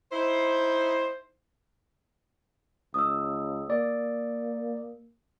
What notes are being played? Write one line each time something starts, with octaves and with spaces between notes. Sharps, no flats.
D#4 E4 C5
C#2 D#6 E6
A#3 D5